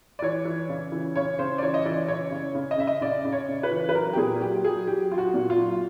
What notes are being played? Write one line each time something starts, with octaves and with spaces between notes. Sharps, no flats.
D5
E3 C#5
E3
C#3
E3
C#3 C#5
C#3 C5
D5
E3 C#5
D#5
E3 D5
C#3 C#5
C#3
C#3
D#5
C#3 E5
D#5
C#3 D5
C#3
C#5
C#3
B4
E3
B4
F#3 A#4
G4
A#2 G#4
F#3 G4
F#3 G#4
F#3 G4
F#3 F4
F#4
A#2
F4
F#3